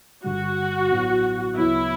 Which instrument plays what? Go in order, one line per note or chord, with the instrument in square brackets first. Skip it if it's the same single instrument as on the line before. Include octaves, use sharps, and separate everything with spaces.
[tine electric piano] G1 G2 D3 G3 [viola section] F#4
[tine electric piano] A1 A2 F#3 B3 E4
[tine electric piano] D2 C#3 F#3 B3 [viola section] E4